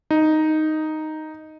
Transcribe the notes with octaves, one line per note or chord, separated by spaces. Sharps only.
D#4